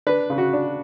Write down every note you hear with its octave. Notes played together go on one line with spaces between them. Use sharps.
D4 B4
C#3
F#4
D4